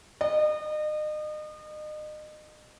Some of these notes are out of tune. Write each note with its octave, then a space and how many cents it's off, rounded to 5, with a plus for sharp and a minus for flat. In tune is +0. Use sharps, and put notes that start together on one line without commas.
D#5 -35